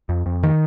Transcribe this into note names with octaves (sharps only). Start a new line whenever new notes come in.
F2
F2
D#3